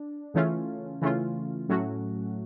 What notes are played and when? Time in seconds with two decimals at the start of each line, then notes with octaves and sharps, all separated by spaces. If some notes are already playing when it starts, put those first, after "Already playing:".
Already playing: D4
0.34 C#3 E3 A3 C#4 F4
1.02 C#3 E3 A3 C#4 F4
1.69 A2 F#3 A3 C#4 F#4